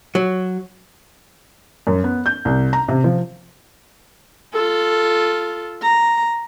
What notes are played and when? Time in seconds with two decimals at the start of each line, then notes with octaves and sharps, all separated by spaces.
0.15 F#3
1.87 F#2
2.04 B3
2.26 G6
2.45 C2
2.73 A#5
2.88 C3
3.04 F3
4.54 F4 A4
5.82 A#5